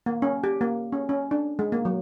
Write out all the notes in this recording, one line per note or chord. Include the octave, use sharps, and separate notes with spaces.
A#3
C#4
G4
A#3
C#4
C#4
D4
G#3
A#3
F#3